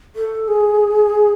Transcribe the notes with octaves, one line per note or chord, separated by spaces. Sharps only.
A4
G#4